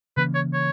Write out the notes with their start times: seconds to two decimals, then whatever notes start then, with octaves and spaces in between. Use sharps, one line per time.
0.17 C#3 E3 A#3 C#4 B4
0.35 C#5
0.53 C#5